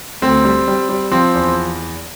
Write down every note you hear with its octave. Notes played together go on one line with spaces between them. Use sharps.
D2 C4
G3
G3
G3
F3 C4
E2